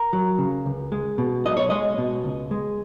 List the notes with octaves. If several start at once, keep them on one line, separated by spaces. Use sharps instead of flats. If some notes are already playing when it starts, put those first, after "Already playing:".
Already playing: A#4
F#3
C#3
C#2
G#3
B2
B1 D#5
C#5
G#3 D#5
B2
C#2
G#3